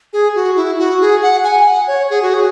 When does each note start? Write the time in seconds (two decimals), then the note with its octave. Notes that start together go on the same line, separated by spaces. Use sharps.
0.13 G#4
0.35 F#4
0.56 E4
0.79 F#4
1.01 G#4
1.22 F#5
1.44 G#5
1.65 F#5
1.87 C#5
2.10 G#4
2.22 F#4
2.34 G#4